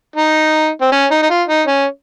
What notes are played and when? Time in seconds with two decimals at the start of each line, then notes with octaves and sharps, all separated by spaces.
0.16 D#4
0.81 C4
0.92 C#4
1.11 D#4
1.22 D#4
1.30 F4
1.48 D#4
1.67 C#4